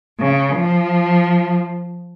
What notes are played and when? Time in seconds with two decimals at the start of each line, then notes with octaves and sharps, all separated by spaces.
0.20 C#3
0.56 F3